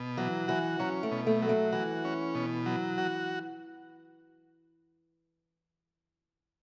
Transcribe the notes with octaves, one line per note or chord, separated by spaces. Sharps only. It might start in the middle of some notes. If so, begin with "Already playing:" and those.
Already playing: B2
E3 F#3
E3 F#4
F#3 C#4
A3
B2
A3
F#3
A3
E3 F#4
C#4
B2
F#3
F#4